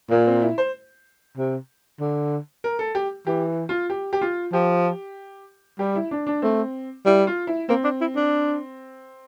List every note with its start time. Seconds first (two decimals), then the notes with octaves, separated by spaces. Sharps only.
0.10 A#2 A#3
0.27 C4
0.42 E4
0.58 C5
1.37 C3
2.00 D3
2.64 A#4
2.79 A4
2.95 G4
3.27 E3 G4
3.69 F4
3.90 G4
4.13 G4
4.21 F4
4.52 F3 G4
5.79 G3 G4
5.96 E4
6.11 D4
6.27 D4
6.42 A3 C4
7.06 G3 E4
7.27 F4
7.47 E4
7.69 A#3 C4
7.84 D4
8.01 E4
8.16 D4